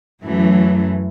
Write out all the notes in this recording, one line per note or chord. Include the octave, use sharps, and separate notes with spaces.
F#2 E3 F#3 A3